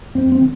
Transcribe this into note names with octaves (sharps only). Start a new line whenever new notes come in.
F2 C4
C4
D3